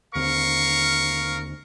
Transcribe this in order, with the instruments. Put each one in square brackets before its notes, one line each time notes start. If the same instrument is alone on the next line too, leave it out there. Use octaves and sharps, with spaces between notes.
[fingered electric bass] D#2 D3 C4 [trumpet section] A#4 F5 C#6